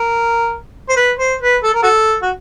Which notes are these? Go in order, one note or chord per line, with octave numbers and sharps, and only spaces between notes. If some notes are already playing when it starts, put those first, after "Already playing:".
Already playing: A#4
C5
B4
C5
B4
A4
A#4
F#4 A4
F#4